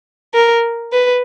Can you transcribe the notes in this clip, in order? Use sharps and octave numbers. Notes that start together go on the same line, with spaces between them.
A#4
B4